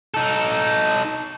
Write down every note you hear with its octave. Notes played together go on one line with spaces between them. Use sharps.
D#4 A4